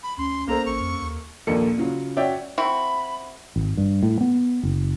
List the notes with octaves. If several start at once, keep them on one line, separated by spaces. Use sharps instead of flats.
B5
D2 C#4 C6
C2 A#3 A4 C5 A#5
A1 C#6
F2
D#2
A#1 D#2 A#2 A#3 A4 C#7
C#3 F#3 F4
C#4 F#4 C#5 D5 E5 G5
C4 E4 F#4 B5
G#1
G2
A2
B3
F#1